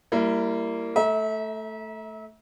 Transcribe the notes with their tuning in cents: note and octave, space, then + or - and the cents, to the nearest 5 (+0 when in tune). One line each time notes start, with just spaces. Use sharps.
G3 +0 A#3 -15 E4 +20
A3 +0 E5 -30 A#5 +30